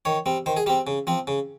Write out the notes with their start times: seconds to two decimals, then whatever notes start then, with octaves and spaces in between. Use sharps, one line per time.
0.05 D#3 C#5
0.26 G3 C4
0.46 D#3 C5
0.57 G#4
0.66 G3 G4
0.69 C4
0.87 C#3
1.07 F3 C4
1.27 C#3